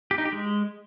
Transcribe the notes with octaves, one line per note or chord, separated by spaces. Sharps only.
G4
D#4
G4
G#3